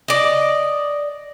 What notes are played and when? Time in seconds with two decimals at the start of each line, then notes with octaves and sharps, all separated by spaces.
0.08 D5 D#5